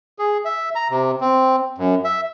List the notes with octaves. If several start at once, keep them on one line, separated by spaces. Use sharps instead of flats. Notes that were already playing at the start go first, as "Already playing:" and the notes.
G#4
E5
A#5
C3
C4
F#2
E5